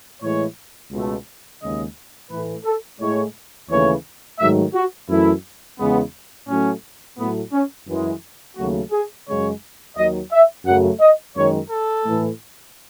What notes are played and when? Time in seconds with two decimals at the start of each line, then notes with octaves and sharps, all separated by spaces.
0.21 A2 E3 G#3 C#5
0.91 C#2 B2 A3
1.61 D#2 C#3 G#3 D#5
2.30 A2 E3 A3 B4
2.65 A4
3.00 A2 G#3 C#5
3.69 D#2 C#3 E3 A3 C#5
4.39 G#2 D#3 F#3 A3 E5
4.74 F#4
5.09 F#2 E3 A3 E4
5.78 E2 C#3 G#3 B3
6.48 A2 F#3 A3 C#4
7.18 A2 F#3 A3 B3
7.53 C#4
7.87 F#2 E3 G#3
8.57 D#2 C#3 F#3 A3 F#4
8.92 G#4
9.27 F#2 C#3 G#3 C#5
9.96 D#2 D#3 F#3 D#5
10.32 E5
10.66 F#2 C#3 F#3 A3 F#5
11.00 D#5
11.36 F#2 D#3 G#3 C#5
11.70 A4
12.05 A2 E3 A3